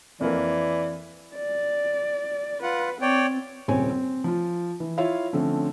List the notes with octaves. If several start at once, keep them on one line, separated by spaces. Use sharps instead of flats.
F2 E3 A#3 D5
D5
F4 B4 F#5
C4 C#5 D5 G5
D#1 C#3 C4 C#5 G#5
C4
F3 F4
E3
E4 F4 C#5 E5 F5
D3 F3 A3 C4 C#4